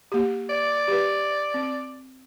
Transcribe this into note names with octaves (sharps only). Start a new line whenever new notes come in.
A#3 G4
D5
G4 B4
C4